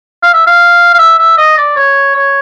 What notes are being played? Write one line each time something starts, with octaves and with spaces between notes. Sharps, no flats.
F5
E5
F5
F5
E5
E5
D#5
D5
C#5
C#5